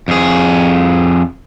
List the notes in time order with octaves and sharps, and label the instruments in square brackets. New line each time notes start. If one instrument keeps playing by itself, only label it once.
[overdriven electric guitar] F2 G#4